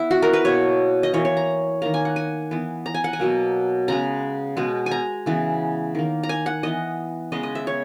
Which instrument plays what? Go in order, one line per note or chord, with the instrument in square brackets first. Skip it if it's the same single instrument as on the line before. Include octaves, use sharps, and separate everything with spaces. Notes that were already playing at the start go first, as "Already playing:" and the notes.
Already playing: [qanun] B3 E4
F#4
A#4
B4
B2 A#3 C#5
D#5
E3 A#3 C#5
C#5
A#5
D#3 A#3 A#5
G#5
F#5
G#5
E3 B3
A#5
G#5
F#5
G#5
B2 F#3 A#3
C#3 G#3 B3 A#5
B2 G#3 B3
G#5
A#5
C#3 E3 B3
D#3 A#3
A#5
G#5
F#5
E3 B3 D#5
C#3 G#3 B3 D#5
D#5
E5
C#5